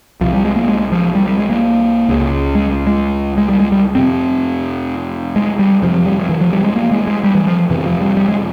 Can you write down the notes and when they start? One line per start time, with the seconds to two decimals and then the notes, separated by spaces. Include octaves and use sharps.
0.21 C2 C3 F3
0.33 G3
0.45 G#3
0.56 A#3
0.68 G#3
0.92 F3
1.15 G3
1.26 G3
1.39 G#3
1.50 A#3
2.09 C#2 C#3
2.55 G#3
2.87 G#3
3.38 G#3
3.49 G3
3.60 G#3
3.72 G3
3.95 F2 C3 C4
5.36 G#3
5.59 G3
5.82 F2 C3 F3
5.94 F3
6.06 G3
6.18 F3
6.29 E3
6.41 F3
6.53 G3
6.64 G#3
6.76 A#3
6.91 G#3
7.07 G#3
7.24 G3
7.35 E3
7.47 F3
7.70 F2 C3 E3
7.85 F3
8.01 G3
8.17 G3
8.28 G#3